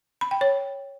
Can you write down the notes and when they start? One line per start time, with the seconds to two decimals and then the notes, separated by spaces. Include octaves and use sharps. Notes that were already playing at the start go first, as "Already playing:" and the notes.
0.21 B5
0.31 G5
0.41 C#5